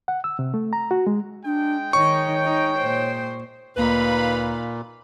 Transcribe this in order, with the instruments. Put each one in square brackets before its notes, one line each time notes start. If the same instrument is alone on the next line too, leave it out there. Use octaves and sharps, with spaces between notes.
[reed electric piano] F#5
E6
C3
A3
A#5
F#4
G#3
[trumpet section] G#3 G5 [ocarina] D4
[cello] D#3 D#4 [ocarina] C#5 [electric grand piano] C#6
[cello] D#4
A#2 C5
[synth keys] D2 A#3 [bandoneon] A#2 [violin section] D#4 F5 B5 [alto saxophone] B4